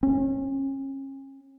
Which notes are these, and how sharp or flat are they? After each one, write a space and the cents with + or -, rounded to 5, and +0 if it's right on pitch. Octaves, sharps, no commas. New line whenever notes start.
C#4 -35